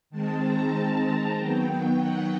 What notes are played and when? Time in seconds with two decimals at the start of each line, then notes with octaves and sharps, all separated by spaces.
0.10 D#3 G#3 C4 A5
0.43 A#5
0.74 A5
1.36 D#3 F#3 B3 G5
1.99 F#5